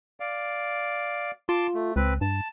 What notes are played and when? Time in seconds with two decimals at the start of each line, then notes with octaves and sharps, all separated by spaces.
0.20 D5 F5
1.49 F4 A5 C6 D6
1.74 A3
1.96 C#2 C4 B4
2.21 G2 A5